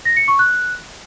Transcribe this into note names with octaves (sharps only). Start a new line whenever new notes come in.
A#6
C#7
C#6
F#6